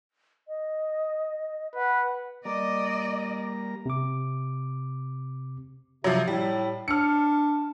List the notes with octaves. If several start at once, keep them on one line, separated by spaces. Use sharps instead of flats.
D#5
B4 F#5
G3 A#3 D5 D#5 A#5
C3 D6
C3 F3 F#3
A2 G3
D4 F6 C#7